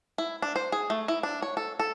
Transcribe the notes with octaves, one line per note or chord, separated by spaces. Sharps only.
E4
D4
C5
G#4
A3
E4
D4
C#5
A4
A4